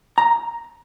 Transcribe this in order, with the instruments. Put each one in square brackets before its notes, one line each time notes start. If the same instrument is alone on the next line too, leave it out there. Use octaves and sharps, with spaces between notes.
[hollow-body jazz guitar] A#5